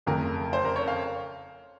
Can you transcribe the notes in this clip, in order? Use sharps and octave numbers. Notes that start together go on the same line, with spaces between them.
F#1 F2 C#3 A3 A#4
C5
A#4
C#5
F5